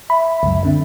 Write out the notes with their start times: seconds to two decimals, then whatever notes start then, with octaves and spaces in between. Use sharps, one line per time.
0.10 E5 B5
0.43 C#2 F#2
0.65 D3 C4